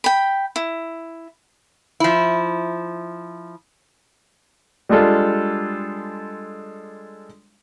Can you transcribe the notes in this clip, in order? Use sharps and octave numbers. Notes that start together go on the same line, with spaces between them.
G5 B5
E4
F3 E4
G3 G#3 D4 F4 A4